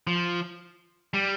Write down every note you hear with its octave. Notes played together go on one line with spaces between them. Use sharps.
F3
G3